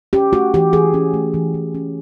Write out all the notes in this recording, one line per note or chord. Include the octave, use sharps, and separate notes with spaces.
C#4 G4
A3 F#4
E3 G4
E3 G#4
C#4
A3
E3
E3
C#4